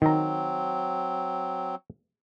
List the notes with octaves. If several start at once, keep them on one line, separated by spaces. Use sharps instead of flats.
D#3 F#3 C4 A#5